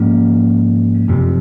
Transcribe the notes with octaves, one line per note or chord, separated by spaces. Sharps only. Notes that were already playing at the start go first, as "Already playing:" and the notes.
Already playing: G#2 F3 A#3 C#4
F#1 F2 C3